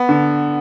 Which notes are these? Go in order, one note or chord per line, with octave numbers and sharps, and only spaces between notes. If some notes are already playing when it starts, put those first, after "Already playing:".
Already playing: B3
D3